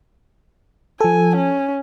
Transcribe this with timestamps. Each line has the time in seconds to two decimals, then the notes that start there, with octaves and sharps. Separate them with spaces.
1.01 F3 A4 G#5
1.36 C#4